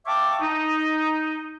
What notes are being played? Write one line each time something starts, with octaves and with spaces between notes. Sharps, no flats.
E5 F5 G5 A5 C#6 D6
D#4